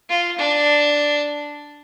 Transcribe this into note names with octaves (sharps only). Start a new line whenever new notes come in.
F4
D4